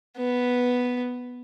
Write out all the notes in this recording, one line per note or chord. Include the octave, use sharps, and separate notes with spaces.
B3